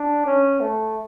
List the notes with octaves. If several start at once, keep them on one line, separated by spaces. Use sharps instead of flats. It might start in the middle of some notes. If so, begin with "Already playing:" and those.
Already playing: D4
C#4
A3